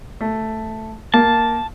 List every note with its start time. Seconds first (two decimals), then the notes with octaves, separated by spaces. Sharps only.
0.21 A3
1.14 A#3 A5